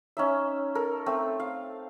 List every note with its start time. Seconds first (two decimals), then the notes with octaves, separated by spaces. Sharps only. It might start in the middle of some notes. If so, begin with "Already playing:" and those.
0.17 C#4 D#4 E5
0.75 A4 A#4
1.06 A3 C4
1.40 F5